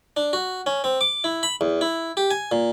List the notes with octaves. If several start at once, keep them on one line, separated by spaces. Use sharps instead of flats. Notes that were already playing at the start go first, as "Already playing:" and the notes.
D4
F#4
C#4
C4
D6
E4
B5
E2
E4
G4
G#5
A#2